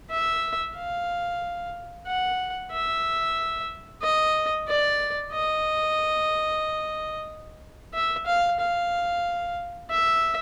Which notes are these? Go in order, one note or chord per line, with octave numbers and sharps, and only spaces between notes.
E5
F5
F#5
E5
D#5
D5
D#5
E5
F5
F5
E5